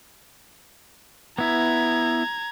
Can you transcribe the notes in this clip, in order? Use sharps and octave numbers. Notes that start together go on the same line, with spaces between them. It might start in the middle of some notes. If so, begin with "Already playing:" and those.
B3 E4 A#5 G#6